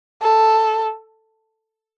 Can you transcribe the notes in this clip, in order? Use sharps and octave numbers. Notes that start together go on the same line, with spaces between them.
A4